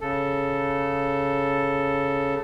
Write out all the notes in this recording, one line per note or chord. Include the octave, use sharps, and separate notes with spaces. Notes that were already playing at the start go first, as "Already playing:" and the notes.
C#3 A4